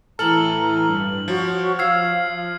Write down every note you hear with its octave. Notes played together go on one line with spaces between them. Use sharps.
A2 E3 A4 A#5 F6 F#7
G2
F3 F#4 C#5
F3 F5 E6 F6 G#6 C7